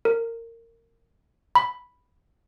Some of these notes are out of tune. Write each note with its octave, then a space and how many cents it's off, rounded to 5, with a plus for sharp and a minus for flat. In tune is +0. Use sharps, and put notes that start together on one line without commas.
A#4 -20
B5 +0